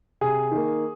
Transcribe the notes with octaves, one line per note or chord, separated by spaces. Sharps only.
C3 G#4
D#3 A#3